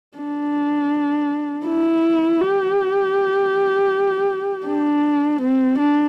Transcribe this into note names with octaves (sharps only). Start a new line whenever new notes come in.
D4
E4
G4
D4
C4
D4